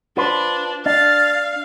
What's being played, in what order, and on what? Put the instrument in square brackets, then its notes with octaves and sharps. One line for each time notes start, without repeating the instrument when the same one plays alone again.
[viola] D4 [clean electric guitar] F4 B4 C5
[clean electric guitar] D4 [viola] F5 [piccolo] A6